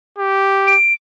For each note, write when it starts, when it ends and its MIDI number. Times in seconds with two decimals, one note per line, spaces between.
0.18 0.75 67
0.67 0.93 98